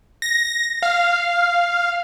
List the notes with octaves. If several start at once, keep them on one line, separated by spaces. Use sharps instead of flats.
A#6
F5